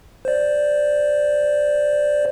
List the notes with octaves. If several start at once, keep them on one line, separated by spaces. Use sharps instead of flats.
C5 D5